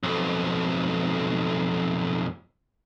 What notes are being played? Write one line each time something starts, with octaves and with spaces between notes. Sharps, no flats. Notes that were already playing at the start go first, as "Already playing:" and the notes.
B1 F2